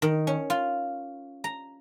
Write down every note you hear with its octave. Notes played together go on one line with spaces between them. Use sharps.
D#3
C#4
F4
A#5